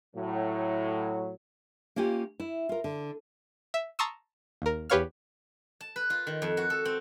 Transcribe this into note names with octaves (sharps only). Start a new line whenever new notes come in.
A2 F#3
A#3 C#4 F4 G4
E4
F4 A#4
D3
E5
A5 A#5 C6 C#6 D#6 E6
D#2 A#4
E2 G4 B4 C#5 F5 F6
A5
B4
F4
D#3
F2
F#4
A4
C4